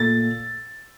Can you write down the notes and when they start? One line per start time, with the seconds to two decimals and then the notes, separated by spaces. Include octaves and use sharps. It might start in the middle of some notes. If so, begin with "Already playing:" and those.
Already playing: A#2 A3 A6